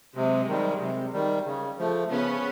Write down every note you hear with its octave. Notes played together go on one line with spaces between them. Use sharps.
C3 F#3 G#3
D#3 G3
C3
D#3 G3
C#3
F3 A3
C#3 B3 C#4